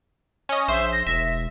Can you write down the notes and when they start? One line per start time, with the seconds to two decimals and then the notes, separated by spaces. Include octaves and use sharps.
0.49 C#4 D#5
0.68 A#1 C5 E5
0.92 A#6
1.07 E1 E5 A#6